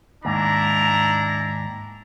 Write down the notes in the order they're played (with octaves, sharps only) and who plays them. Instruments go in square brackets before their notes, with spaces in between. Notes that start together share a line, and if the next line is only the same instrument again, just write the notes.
[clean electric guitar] D#2 G#2 [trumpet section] D4 E4 A#5